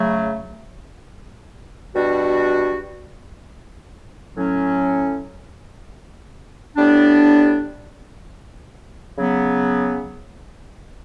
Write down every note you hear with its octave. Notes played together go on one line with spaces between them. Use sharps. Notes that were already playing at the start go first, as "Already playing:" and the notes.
Already playing: C#3 F#3 A3
B2 G3 D4 F#4
A2 F#3 C#4
A2 G3 B3 D4
C#3 F#3 B3